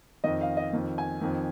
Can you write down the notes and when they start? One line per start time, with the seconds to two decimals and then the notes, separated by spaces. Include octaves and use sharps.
0.24 F2 D#3 D#5
0.41 F5
0.57 D#5
0.73 F2 D#3
0.98 G#5
1.21 F2 D#3